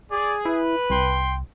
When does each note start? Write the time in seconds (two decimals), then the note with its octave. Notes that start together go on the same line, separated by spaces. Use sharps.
0.11 G#4 D5
0.45 E4 B4
0.90 C2 G5 C6